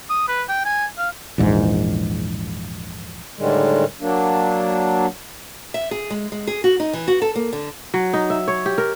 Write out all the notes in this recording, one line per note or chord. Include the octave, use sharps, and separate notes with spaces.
D#6
B4
G5
G#5
F5
A#1 E2 G#2
A2 D3 D#3 G3 G#3
F#3 A#3 D4
E5
G#4
G#3
G#3
G#4
F#4
D#4
E3
F#4
A4
A#3
D3
F#3
D#4
E5
C#5
G4
A#4